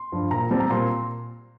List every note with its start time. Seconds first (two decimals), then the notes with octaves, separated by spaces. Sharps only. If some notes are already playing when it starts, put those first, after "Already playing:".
Already playing: C6
0.12 G2 F3
0.31 A#2 A#5
0.51 G3 C4 A5
0.60 A#5
0.70 A#2 C6